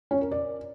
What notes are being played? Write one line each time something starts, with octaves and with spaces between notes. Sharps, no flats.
C#4
A#4
D5